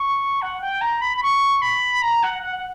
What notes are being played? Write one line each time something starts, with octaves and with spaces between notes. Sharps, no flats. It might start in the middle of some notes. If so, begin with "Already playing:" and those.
Already playing: C#6
F#5
G5
A#5
B5
B5
C#6
B5
A#5
F#5
F#5
F#5